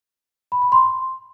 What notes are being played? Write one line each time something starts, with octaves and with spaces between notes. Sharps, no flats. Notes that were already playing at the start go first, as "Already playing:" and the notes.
B5
B5
C6